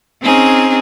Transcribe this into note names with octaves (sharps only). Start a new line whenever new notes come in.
C4 C#4 D#4 G#4